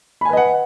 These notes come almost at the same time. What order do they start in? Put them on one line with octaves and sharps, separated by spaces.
B5 G#5 B4 D#5 F#5